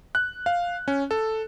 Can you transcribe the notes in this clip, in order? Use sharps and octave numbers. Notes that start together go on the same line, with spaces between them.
F#6
F5
C#4
A4